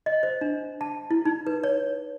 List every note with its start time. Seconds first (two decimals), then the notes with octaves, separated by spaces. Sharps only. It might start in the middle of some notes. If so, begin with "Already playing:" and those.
0.06 D#5
0.23 C5
0.41 D4
0.81 A5
1.11 E4
1.25 D#4
1.47 B4
1.64 C#5